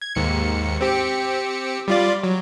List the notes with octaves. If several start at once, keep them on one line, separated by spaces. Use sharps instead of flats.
G#6
D#2 G#2 C#7
C4 G4 C#7
G3 F4 D5
F#3